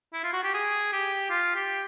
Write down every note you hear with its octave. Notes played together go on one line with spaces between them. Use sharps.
E4
F4
F#4
G4
G#4
G4
F4
G4